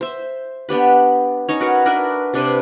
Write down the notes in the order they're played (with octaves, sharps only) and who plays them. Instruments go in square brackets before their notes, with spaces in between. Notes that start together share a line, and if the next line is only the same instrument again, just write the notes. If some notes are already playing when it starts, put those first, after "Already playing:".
[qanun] C5 E5
B3 D4 G4 B4
C#4 D#4 C#5
F#4 A#4 B4 C#6
D4 A#4 B4 E5
C3 D4 B4 C5